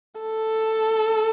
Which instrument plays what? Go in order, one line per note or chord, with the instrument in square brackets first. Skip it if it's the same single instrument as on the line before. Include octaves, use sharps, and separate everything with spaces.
[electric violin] A4